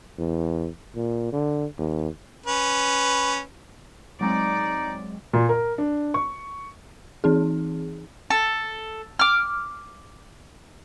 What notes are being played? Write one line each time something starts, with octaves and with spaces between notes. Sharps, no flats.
E2
A#2
D3
D#2
C#4 B4
F#3 G#3 C4 D#4 D5
A#2
A#4
D4
C#6
E3 C4 D#4 G#4
A4
D6 F6